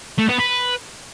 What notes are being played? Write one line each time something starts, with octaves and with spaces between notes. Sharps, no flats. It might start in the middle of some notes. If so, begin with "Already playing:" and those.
A3
B3
B4